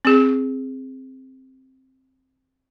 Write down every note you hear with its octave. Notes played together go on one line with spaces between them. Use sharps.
C4 G#4